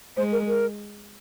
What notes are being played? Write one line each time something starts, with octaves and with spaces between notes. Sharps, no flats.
G#3 C5
A#4
A#4